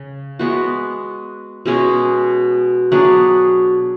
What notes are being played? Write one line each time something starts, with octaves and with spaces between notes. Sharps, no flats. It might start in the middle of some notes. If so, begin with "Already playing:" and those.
Already playing: C#3
G#3 B3 F#4
B2 G#3 C#4 G#4
F#3 B3 D4 G#4